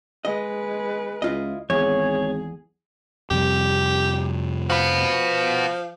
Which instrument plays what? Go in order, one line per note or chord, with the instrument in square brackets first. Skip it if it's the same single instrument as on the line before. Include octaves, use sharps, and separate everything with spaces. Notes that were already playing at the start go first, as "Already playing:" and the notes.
[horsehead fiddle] G#3 B4 [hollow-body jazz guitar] D#5
[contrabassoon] C#2 [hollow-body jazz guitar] E4 F4 D#5
[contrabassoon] G#1 [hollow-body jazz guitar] E2 [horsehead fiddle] G#4 [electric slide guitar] C#5
[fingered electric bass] F2 C3 G3 [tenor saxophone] G4
[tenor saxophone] F3 [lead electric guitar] F#4 B4